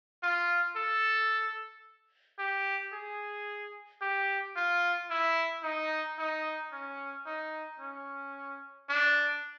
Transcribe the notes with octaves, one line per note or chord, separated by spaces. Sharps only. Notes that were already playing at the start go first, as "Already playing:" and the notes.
F4
A4
G4
G#4
G4
F4
E4
D#4
D#4
C#4
D#4
C#4
D4